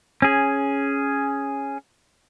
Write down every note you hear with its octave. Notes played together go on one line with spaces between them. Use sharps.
C#4 G#4